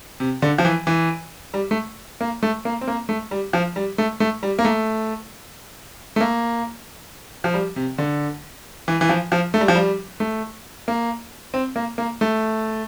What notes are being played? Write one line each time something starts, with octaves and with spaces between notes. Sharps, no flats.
C3
D3
F3
E3
E3
G3
A3
A#3
A3
A#3
C4
A#3
A3
G3
F3
G3
A3
A3
G3
A#3
A3
A3
A#3
F3
G3
C3
D3
E3
E3
F3
F3
A3
G3
F3
G3
A3
A#3
C4
A#3
A#3
A3